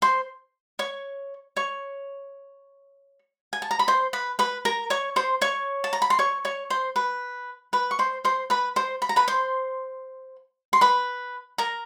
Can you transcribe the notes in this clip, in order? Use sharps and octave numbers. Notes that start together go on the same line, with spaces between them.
C5 C6
C#5 C#6
C#5 C#6
G#5
A5
A#5
B5
C5 C6
B4 B5
B4 B5
A#4 A#5
C#5 C#6
C5 C6
C#5 C#6
A5
A#5
B5
C6
C#5 C#6
C#5 C#6
C5 C6
B4 B5
B4 B5
C#6
C5 C6
C5 C6
B4 B5
C5 C6
B5
A#5
B4 B5
C5 C6
C6
B4 B5
A#4 A#5